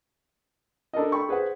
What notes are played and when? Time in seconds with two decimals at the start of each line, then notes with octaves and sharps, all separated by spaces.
0.93 D4 A4 A#4 D#5
1.12 A4 G5 B5 C#6
1.29 G#4 B4 C5 F#5